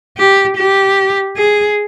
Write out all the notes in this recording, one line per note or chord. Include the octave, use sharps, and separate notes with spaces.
G4
G4
G#4